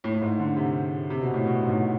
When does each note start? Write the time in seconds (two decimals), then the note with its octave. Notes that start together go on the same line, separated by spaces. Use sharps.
0.04 A2
0.14 A2
0.21 G#2
0.40 D3
0.56 C3
1.10 C3
1.21 B2
1.34 A2
1.45 B2
1.63 G#2
1.69 A2